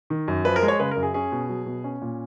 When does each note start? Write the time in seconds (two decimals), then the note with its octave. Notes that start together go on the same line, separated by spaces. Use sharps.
0.10 D#3
0.28 F#2
0.45 F3 B4
0.56 A#4
0.62 G#3
0.68 C#5
0.80 C#3 B4
0.91 A#4
0.97 F#2
1.03 G#4
1.14 C#4 G#4
1.32 B2
1.49 F#3
1.66 B2
1.84 C#4
2.01 A#2